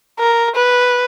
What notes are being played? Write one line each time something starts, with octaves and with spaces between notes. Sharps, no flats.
A#4
B4